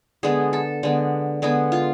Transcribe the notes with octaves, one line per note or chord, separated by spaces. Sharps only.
D3 G#3 B3 G#4
A4
D3 G#3 B3
D3 G#3 B3 G#4
F4